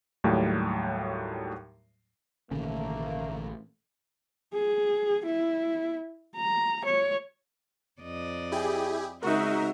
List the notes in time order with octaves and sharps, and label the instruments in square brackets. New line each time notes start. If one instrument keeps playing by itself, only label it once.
[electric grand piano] D#2 A2 F#3 G3
[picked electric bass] A1 C#4 [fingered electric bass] B2 D3 D#3 [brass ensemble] A3 A#3
[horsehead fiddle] G#4
E4
A#5
C#5
[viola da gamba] F2 D5 D#5
[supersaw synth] E4 G4 G#4
[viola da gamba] C#3 G#3 C4 [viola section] D#4 F#4 [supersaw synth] A#4 E5